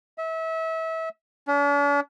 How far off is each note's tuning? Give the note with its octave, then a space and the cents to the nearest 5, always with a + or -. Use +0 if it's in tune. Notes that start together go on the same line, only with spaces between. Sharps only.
E5 -30
D4 -45